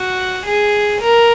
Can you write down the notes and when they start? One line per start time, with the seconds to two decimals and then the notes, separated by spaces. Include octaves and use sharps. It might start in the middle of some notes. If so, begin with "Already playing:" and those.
Already playing: F#4
0.45 G#4
1.01 A#4